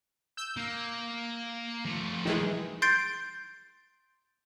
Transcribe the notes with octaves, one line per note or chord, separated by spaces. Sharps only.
E6 G6
A#3
F3 A3
D#3 E3 G#3
C6 G6 A6 C7 D7